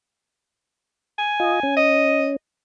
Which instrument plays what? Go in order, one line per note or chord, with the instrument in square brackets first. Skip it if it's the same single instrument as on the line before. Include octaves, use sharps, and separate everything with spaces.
[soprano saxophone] G#5
[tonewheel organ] F4 D#5
C#4
[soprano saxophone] D#5